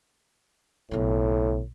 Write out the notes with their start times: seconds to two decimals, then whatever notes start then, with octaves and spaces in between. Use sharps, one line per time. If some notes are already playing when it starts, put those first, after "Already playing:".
0.91 B1 A2 C#3